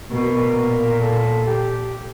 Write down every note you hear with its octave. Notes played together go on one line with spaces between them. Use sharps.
B2 A#4
A#2
A4
G4